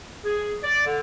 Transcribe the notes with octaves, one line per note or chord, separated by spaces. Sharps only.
G#4
D5
D3